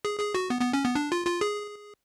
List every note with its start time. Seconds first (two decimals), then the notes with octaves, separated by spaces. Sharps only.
0.05 G#4
0.20 G#4
0.35 F#4
0.50 B3
0.61 B3
0.73 C#4
0.85 B3
0.95 D4
1.12 F4
1.26 F4
1.41 G#4